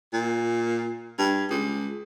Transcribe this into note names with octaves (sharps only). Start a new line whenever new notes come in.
A#2
G2
C#2